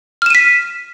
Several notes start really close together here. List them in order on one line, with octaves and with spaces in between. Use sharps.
F6 E7 D#7 B6